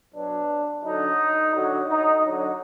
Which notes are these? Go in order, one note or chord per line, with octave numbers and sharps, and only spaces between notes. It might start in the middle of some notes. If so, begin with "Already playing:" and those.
B2 F#3 D4
D3 F#3 D#4
D3 F#3
D#4
D3 F#3